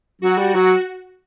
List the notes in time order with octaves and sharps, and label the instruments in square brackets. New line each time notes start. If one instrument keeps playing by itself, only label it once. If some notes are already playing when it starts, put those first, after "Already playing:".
[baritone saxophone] F#3 [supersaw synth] F#4
[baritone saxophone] G3
F#3